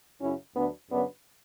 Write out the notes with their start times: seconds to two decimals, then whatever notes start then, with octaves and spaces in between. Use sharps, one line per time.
0.20 F#2 C#3 F#3 C#4 E4
0.55 D2 D3 F#3 B3 D4
0.90 F#2 C#3 F#3 B3 D4